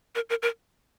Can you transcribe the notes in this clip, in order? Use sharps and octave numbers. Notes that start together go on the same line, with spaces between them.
A#4
A#4
A#4